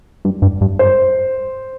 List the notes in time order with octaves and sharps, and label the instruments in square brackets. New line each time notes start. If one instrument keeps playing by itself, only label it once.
[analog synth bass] G2
G2
G2
[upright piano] C5